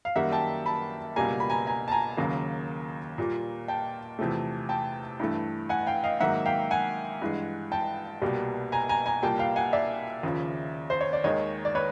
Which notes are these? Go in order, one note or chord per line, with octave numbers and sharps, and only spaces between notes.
F5
F#2 D#3 G3 A#3 E5 F#5
G5 A5
A5 B5
C#2 B2 G3 A#3 G#5 A#5
B5
G#5 A#5
G#5 A#5
A5
G#5 A#5
D#2 C#3 F#3 A#3
A#2 G3 A#3
G5 A5
E2 C3 F3 A3
G5 A5
G2 E3 A3
F#5 G#5
F5 G5
D#5 F5
G#2 D#3 F#3 A#3 E5 F#5
F5 G5
F#5 G#5
G2 E3 G#3
G5 A5
C2 B2 G3 A#3
G#5 A#5
G#5 A#5
G#5 A#5
C2 A#2 G3 A#3 G5 A5
F5 G5
F#5 G#5
D5 E5
D#2 C#3 F3
C5
C#5
D5
D#2 D#3 G#3 C#5 D#5
D5
B4 C#5